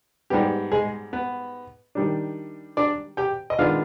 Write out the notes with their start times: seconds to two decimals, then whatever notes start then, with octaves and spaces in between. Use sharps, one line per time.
0.30 G#2 G3 B3 G4
0.72 G#3 G#4
1.13 B3 B4
1.95 D#3 G3 D4
2.77 D4 D5
3.17 G4 G5
3.50 D#5
3.59 D#3 G#3 B3 D4 F4 F5